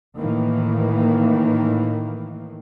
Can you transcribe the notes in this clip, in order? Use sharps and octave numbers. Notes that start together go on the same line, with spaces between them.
A2 D#3 E3 A#3